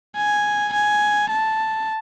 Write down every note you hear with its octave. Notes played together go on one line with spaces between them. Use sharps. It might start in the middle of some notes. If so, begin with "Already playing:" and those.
G#5
G#5
A5